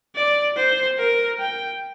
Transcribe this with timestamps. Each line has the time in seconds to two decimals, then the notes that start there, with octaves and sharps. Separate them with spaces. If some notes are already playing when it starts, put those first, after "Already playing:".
0.15 D5
0.56 C5
0.98 A#4
1.39 G5